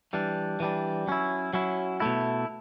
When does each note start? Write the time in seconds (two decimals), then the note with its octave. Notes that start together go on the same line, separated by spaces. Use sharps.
0.13 E3 G3 D4
0.60 E3 G3 D4
1.07 F#3 C#4 E4
1.53 F#3 C#4 E4
2.00 B2 A3 E4